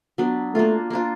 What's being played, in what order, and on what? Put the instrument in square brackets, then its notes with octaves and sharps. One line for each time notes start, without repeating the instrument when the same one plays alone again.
[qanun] F#3 B3 D4
[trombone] A3 [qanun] A#3 D4 F4
[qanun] A#3 D4 F4